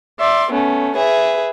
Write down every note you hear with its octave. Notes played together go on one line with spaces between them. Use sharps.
D5 E5 C6
A3 B3 C#4
G#4 B4 E5